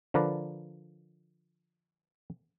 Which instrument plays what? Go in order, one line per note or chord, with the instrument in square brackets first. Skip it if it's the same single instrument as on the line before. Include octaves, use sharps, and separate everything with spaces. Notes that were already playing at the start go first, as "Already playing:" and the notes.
[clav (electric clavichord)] D3 F3 A#4 B4 D5 A#5